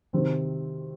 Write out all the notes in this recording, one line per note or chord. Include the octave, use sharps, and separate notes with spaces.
C3 D#3 C4